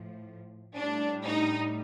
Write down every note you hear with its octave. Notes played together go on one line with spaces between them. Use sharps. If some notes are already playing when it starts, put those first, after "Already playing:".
Already playing: A2 F3
A2 G3 D4
D#4